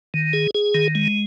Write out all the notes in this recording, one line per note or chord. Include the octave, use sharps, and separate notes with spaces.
D#3
G#4
G#4
D#3
G#3